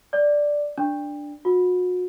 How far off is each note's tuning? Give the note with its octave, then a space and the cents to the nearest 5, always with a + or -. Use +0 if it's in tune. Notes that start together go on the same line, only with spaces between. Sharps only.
D5 +0
D4 +0
F#4 -35